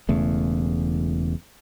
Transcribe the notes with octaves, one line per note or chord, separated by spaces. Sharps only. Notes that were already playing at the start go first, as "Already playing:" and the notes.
E1 E2 C#3 A3